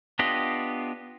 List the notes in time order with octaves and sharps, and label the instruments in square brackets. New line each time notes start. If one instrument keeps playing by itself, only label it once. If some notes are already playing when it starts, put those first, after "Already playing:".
[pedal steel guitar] B3 D4 F4 G4 D#5